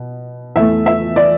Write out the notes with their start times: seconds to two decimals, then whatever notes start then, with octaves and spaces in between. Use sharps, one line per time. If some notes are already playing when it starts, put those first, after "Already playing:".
Already playing: B2
0.56 E2 E3 A3 E5
0.86 E5
1.16 D5